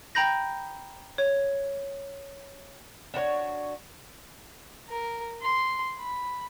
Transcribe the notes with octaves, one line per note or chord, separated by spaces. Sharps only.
G5 A#5 B5 G6 A#6
C#5
D4 F#4 B4 C#5
A#4
C6
B5